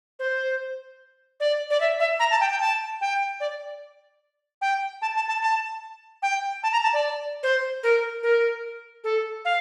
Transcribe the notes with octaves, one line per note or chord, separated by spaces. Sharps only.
C5
D5
D5
E5
E5
A#5
A5
G5
G5
A5
G5
D5
G5
A5
A5
A5
A5
G5
A5
A#5
A5
D5
C5
A#4
A#4
A4
F5